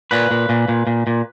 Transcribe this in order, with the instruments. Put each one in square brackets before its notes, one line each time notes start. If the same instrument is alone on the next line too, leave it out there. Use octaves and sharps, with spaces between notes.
[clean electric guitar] A#2 B4
A#2
A#2
A#2
A#2
A#2